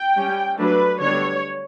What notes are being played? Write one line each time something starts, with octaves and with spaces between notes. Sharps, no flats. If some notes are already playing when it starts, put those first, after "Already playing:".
Already playing: G5
G3 C#4
F#3 A3 D4 B4
D3 G3 B3 D4 C#5